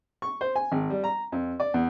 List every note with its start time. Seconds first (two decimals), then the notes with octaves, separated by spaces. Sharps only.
0.22 C#6
0.41 C5
0.56 G#5
0.72 G#1
0.90 G3
1.04 A#5
1.32 F2
1.60 D5
1.74 E2